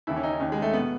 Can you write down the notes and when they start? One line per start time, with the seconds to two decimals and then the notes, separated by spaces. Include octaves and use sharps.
0.07 D#2 C#3 E3 E4
0.16 C#4
0.23 D#4
0.40 D#2 D#3 C#4
0.52 G#3
0.62 A3
0.73 B3
0.79 B2